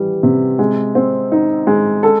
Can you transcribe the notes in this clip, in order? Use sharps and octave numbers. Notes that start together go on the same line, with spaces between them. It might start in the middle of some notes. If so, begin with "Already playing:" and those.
Already playing: E3 G3
C3
G#3
C4
D#4
G#3
A4